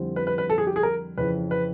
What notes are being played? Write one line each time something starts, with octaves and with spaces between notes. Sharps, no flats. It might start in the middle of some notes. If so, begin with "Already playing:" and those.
Already playing: F2 D3 G3 C4 E4
B4
B4
B4
A4
G#4
G4
G#4
A#4
F2 C#3 E3 B4
B4